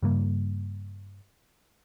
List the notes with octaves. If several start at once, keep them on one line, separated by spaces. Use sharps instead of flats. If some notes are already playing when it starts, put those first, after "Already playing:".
G2 C#3 G3 A#3